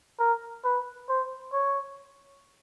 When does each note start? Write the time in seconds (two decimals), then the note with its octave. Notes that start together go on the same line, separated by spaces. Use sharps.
0.19 A#4
0.65 B4
1.09 C5
1.53 C#5